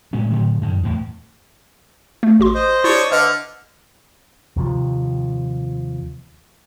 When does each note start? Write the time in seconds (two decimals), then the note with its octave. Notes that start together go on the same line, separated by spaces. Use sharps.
0.13 A2 G#3 C#4
0.30 A2 D3 F#3
0.62 F#2 D#3
0.83 E2 A2
2.23 A3
2.39 A1 F#4 C6
2.55 C5 D#5
2.84 D4 E4 G4 C#5
3.12 D3 B4 D#5 F6
4.56 D#2 C3 F3